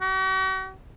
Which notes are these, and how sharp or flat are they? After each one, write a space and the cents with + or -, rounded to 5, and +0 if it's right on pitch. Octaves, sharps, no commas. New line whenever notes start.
F#4 +45